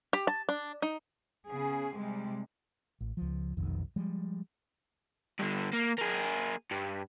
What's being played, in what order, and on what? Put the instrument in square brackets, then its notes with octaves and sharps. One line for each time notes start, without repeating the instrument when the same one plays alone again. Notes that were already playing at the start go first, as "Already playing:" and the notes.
[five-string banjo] G4
A5
D4
D#4
[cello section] C#3 B3 G#4
C3 G3 G#3
[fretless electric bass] A1
C#2 F3
F1 B1 F2 D#3
F3 G3 G#3
[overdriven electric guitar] G2 D3
A#3
A#3 G#4
G2